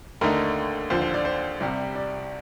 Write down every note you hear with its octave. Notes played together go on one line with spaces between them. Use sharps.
D#2 D3 A3 D#4 A#4
D#2 D3 F3 C5
C5
D5
C5
C2 C3 G3
D5